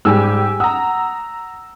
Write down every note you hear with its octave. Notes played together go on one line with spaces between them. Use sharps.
G#2 G3 G4 G#5 E6
F#5 A#5 D#6 E6